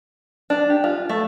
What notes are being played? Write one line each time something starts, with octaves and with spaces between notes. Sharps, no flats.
D4
G4
F4
A3